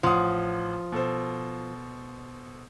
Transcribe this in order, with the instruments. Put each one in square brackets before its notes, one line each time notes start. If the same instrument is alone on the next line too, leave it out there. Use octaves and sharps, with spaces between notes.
[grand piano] A1 F#5 D#6 [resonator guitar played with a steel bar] F3
[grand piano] B2 A4 C5